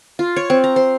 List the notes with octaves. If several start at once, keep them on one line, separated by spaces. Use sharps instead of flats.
F4
C#5
C4
A#5
C5